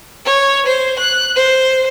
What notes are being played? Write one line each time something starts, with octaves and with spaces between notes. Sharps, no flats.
C#5
C5
F#6
C5